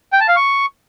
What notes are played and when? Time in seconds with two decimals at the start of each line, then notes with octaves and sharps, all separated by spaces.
0.13 G5
0.21 A5
0.28 F5
0.36 C#6